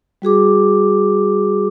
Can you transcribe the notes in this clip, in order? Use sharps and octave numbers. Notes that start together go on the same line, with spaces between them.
G3 F#4 G#4 D6